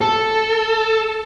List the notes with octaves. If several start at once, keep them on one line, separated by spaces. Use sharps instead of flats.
A4